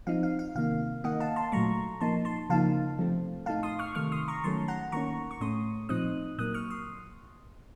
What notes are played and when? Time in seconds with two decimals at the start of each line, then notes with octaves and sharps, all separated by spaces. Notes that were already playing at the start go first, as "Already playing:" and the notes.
0.07 F3 C4 D#4 F5
0.23 F5
0.39 F5
0.55 C3 D#3 A#3 F5
1.04 D#3 A#3 D#4 D#5 F#5
1.20 F5 A5
1.36 A5 C6
1.52 A#2 F#3 A3 A#5 C#6
2.01 F3 A#3 D#4 A5 C6
2.25 A5 C6
2.50 C#3 F3 A#3 D#4 F5 A5
2.99 C3 F3 A3 C4
3.46 A2 A3 D#4 F5 A5
3.63 C6 D#6
3.79 C#6 F6
3.95 C3 D#3 A3 C#6 F6
4.12 C6 D#6
4.28 A#5 C#6
4.44 D#3 F#3 A3 C#4 A5 C6
4.68 F#5 A#5
4.92 D#3 A#3 C#4 A#5 C#6
5.31 C#6
5.41 A2 A3 C#4 C6 D#6
5.89 A#2 F3 C4 D#4 D#6 F#6
6.38 A#2 F#3 A#3 D#6 F#6
6.54 C#6 F6
6.70 C6 D#6